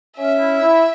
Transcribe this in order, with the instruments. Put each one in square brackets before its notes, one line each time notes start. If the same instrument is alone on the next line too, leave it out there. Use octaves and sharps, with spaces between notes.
[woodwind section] C#4 [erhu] E5
[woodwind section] E4
E4